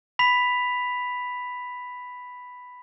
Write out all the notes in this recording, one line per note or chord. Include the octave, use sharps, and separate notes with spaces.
B5 B6 F7